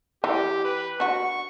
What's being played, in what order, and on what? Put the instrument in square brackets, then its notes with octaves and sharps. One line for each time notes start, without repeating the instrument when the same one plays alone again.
[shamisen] E3 [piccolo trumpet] G4
[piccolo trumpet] B4
[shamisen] D4 F#4 [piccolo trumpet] C#6